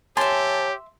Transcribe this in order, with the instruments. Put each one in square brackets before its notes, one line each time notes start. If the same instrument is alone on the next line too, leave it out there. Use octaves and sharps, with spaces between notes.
[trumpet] G4 [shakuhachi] C#5 [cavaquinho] E5 C6 [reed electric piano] G#5 A5 A6